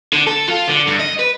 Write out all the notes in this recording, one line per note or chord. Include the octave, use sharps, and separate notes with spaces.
D3
A4
F4
D3
G2
D#5
B4